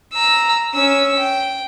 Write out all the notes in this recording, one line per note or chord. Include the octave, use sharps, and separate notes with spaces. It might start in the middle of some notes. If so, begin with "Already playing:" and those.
A#5 E6
C#4 E6
G5